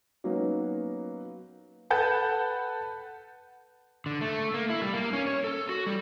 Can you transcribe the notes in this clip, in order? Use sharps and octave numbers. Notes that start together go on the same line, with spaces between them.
F#3 A#3 B3 C#4 D#4 F#4
A4 B4 F#5 A5 G6
D3
A3
A#3
E4
G3
A#3
C#4
C#5
A4
F#4
G3